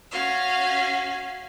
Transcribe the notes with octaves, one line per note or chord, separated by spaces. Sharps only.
C#4 F#4 F5